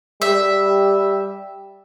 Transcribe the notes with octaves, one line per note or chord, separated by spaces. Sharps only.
G3 E5